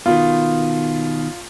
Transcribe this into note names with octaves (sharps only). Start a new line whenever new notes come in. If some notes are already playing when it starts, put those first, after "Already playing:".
B2 D#3 F4